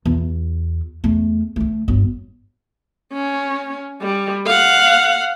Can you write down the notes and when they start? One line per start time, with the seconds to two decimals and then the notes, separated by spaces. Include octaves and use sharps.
0.05 E2 F4
1.04 E2 A3
1.56 D2 A3
1.88 G1 F#3
3.13 C#4
4.01 G3
4.47 F5 F#5